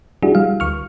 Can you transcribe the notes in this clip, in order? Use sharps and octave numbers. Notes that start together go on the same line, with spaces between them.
G3 D4 E4 F#4 G#4
G3 F5
D2 C#6 F6